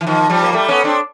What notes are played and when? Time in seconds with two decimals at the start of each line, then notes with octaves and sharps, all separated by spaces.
0.01 E3
0.07 D#3 F3
0.30 F3 G3
0.43 A#3
0.53 G3 A3
0.68 B3 C#4
0.84 C4 D4